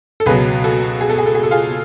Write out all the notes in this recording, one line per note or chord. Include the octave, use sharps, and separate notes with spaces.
A4
C#2 B2 F#3 G#4 B4
F#4 A4
G#4
A4
G#4
A4
G#4
A4
F4 G#4